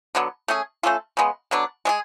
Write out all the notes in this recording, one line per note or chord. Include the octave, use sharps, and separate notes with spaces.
D3 F#3 B3
A3 C#4 G#4
A3 C#4 F4 A4
C#3 G#3 B3
D3 F#3 B3 D4
G#3 D4 G#4